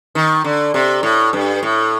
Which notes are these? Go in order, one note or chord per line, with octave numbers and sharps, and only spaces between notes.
D#3
D3
C3
A2
G2
A2